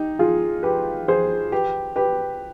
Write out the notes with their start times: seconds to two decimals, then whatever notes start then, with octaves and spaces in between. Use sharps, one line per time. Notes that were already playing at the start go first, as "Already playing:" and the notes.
Already playing: D#4 G4
0.19 F4 G#4
0.63 G4 B4
1.08 G#4 C5
1.52 G4 B4
1.96 G4 B4